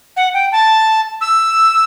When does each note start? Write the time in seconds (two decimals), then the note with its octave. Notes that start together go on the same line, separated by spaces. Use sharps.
0.17 F#5
0.34 G5
0.52 A5
1.21 E6